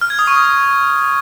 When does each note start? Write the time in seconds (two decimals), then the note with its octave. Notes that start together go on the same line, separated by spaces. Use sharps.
0.01 F6
0.10 G#6
0.19 D#6
0.27 C#6
0.36 D#6